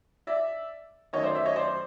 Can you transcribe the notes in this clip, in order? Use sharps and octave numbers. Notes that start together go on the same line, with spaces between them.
D5 E5
F#2 D#3 F#3 A3 C#5 D#5
C5 D5
D5 E5
C#5 D#5
C5 D5